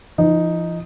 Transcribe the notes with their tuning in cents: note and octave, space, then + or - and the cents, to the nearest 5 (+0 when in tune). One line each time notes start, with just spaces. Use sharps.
F3 -40 D#4 +0